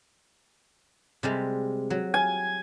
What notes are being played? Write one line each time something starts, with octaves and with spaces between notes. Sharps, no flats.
C3 G3 G#3
F#3
G#5